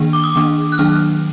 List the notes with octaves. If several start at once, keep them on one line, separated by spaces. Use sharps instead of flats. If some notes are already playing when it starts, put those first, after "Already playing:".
Already playing: D#3 A#3 D4
D6
D#6
D#3 A#3 D4
F#6
D#3 F#3 A#3 D4 F6